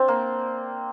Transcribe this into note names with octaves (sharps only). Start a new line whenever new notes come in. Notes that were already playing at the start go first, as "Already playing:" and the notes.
Already playing: C4 D4
A#3